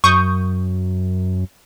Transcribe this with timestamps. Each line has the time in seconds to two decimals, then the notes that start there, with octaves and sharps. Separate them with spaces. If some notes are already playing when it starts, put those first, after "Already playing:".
0.04 F#2 C#6 D#6 G6